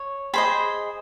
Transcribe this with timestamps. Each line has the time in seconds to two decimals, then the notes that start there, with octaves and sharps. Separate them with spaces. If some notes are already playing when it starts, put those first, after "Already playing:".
Already playing: C#5
0.34 G#4 C5 D#5 A5 B5